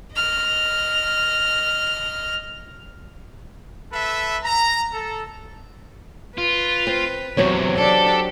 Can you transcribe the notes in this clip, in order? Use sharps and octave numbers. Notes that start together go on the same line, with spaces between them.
D#5 F6
A4 B4 E5
A#5
A4
F4 B4
C4
E2 C3 F#3 C4 C#5
D4 G4 A4 D5